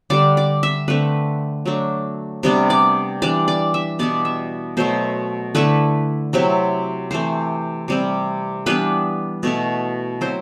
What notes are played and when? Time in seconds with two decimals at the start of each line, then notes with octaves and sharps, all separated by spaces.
0.10 D3 G3 D4 D5
0.37 D5
0.63 E5
0.88 D3 A3 C4 B4
1.66 F#3 A3 D4
2.43 C3 G3 B3 D4
2.70 D5
3.22 E3 G3 D4 D5
3.48 D5
3.74 E5
3.99 B2 G3 B3 E4 D5
4.25 E5
4.77 B2 F#3 A3 C5
5.55 D3 A3 E4 B4
6.33 C3 F#3 C4 E4
7.11 C3 E3 A3 C5
7.88 C3 G3 C4
8.66 E3 G3 B3 D4 B4
9.43 B2 A3 E4
10.21 F#3 C4 E4 C5